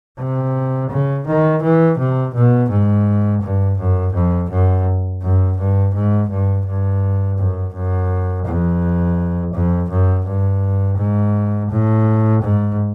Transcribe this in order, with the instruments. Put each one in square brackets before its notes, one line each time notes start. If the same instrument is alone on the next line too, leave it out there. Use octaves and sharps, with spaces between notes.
[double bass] C3
C#3
D#3
E3
C3
B2
G#2
G2
F#2
F2
F#2
F#2
G2
G#2
G2
G2
F#2
F#2
F2
F2
F#2
G2
G#2
A2
G#2